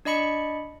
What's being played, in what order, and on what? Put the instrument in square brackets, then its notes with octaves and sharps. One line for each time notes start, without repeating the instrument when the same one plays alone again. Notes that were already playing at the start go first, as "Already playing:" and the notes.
[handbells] D4 D5 D#5 B5 C#7